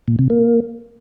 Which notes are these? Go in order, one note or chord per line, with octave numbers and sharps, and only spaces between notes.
A#2
C3
A#3